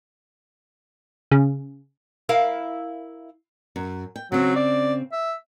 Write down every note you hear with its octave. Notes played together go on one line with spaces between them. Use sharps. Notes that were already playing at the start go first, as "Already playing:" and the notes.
C#3
E4 A#4 F5
F#2
G5
C#3 F#3 C4
D5
E5